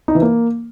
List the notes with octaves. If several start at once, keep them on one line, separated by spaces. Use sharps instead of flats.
D#4
E3
A#3